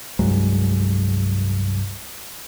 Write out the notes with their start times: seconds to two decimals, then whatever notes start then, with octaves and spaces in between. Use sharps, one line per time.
0.19 C2 G2 F#3 G#3